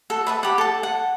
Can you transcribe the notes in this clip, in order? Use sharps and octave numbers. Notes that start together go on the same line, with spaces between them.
F#4 A4
B4 E5 A5
G4 F#5
A4 A5
F#5